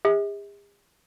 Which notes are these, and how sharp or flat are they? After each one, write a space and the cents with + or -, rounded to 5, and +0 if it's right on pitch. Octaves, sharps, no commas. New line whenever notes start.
G#4 -45 E5 -45